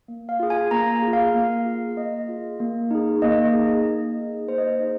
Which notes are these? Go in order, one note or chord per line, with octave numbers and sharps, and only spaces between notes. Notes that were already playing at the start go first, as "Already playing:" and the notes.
A#3
F5
F4 G#4
G#5
A#3 A#5
G#4
F4
F5
A#3
F4 G#4
A#3 D#5
F4 G#4
A#3
D#4 G#4
A#3 D#5
D#4 G#4
A#3
D#4 G#4
A#3 C5
D#5
C5
D#4 G#4